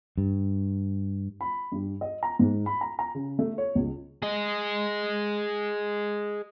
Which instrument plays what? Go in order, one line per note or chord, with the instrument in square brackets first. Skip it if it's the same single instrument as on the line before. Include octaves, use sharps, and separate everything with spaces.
[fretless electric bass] G2
[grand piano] B5
G2
D#5
A#5
G#2
B5
A#5
A#5
C#3
A3
C#5
C#2
[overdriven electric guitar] G#4 D#5